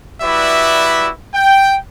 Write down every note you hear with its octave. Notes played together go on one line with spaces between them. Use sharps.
G3 E4 F#4 B4 D5 E5
G5